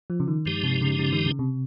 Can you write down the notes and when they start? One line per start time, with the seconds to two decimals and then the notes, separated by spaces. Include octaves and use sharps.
0.10 F3
0.20 C#3
0.28 D#3
0.45 G2 F3 G#3 D#4 G4
0.63 C3
0.81 C#3
0.99 C#3
1.13 D#3
1.26 C#3
1.39 C3